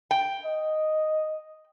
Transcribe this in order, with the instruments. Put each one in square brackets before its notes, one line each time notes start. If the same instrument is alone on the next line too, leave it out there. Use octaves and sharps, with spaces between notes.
[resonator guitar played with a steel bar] G5
[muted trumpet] D#5